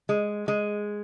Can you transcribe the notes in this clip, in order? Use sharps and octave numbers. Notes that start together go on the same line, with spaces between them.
G#3
G#3